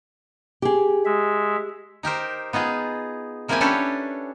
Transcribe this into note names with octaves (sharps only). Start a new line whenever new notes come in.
G4 G#4
G#3 E5
D#4 G4 A#4 C5
B3 D#4 F4 G#4
F3 A#3 C4 E4 G4 G#5
C#4 D4 G4 A4 B4 C#5